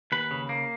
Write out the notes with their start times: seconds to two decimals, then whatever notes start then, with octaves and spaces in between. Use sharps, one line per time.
0.12 D#2 B4
0.31 C#3
0.49 A#3